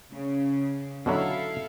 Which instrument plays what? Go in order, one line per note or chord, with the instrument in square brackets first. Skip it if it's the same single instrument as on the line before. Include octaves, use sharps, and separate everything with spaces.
[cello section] C#3
[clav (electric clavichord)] B2 D3 F#3 [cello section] E4 A4 F5